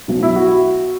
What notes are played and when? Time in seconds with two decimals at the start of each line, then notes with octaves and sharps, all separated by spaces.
0.08 B1 B2 F#3
0.23 E4
0.36 F#4